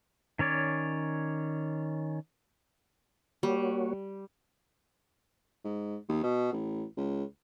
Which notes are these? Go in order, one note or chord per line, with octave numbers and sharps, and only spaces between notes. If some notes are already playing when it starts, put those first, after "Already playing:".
D#3 C#4 C#5 D5
G3 A#3 F#4 C#5
G#2
D#2
B2
A1
C#2